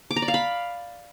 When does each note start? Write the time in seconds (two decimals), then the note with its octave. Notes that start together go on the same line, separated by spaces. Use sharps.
0.11 D6
0.16 A#5
0.22 D5
0.28 F5
0.34 B5